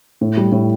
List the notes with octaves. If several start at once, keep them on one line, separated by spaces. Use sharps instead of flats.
A2
G3
A2